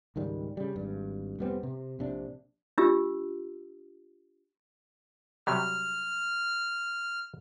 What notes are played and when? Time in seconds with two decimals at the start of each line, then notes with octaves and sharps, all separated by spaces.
0.16 C#2 G#2 D#3 G3
0.57 C#3 G3
0.76 G#1 G2
1.39 F1 G3 B3 C4
1.63 C3
1.99 A#1 C3 D4
2.78 D4 F4 G4 E6
5.47 C3 F#3 G3 F6